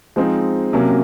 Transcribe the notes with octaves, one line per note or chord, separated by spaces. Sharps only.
F3 G#3 C4 D#4
C3 F#3 A#3 C#4